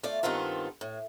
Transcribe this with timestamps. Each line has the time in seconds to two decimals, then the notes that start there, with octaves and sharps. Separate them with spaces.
0.03 A3 F4 D5
0.23 G2 D#3 B3 C4 F4 A4
0.81 A2